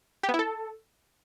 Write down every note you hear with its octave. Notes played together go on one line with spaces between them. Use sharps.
G4
B3
E4
A4